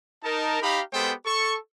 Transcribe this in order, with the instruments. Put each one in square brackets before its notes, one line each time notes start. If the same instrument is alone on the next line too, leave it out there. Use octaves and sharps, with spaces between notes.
[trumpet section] D#4 A#4 A5
D#4 G4 F5 A#5 B5
G#3 B3 G4 A4 C5 G5
A4 C#6